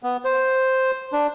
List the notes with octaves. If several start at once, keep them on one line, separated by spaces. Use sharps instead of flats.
B3
C5
D4